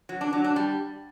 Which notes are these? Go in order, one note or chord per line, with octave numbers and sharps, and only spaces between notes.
F#3
D4
F#3
D4
G3